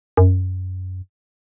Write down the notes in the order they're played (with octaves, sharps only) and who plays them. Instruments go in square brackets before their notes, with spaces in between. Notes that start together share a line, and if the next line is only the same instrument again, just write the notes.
[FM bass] F#2